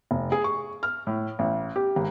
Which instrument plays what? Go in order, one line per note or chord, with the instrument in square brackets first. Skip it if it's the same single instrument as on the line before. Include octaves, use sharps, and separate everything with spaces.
[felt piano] F1
G#4
C#6
F6
A2
A1
G4
G#1